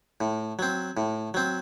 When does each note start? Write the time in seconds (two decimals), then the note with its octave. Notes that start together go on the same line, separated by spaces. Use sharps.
0.21 A2
0.59 F#3 C4
0.97 A2
1.34 F#3 C4